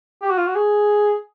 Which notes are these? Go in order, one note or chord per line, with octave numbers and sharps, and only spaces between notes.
G4
F#4
F4
F#4
G#4